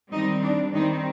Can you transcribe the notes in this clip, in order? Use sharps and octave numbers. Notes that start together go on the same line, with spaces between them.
D#3 G3 C4 D#4
D4
D#3 G3 C4 D#4